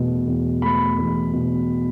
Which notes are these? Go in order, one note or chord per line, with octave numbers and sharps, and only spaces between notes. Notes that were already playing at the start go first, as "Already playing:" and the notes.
Already playing: E2 B2 A3
E2
A3 B5
E2
B2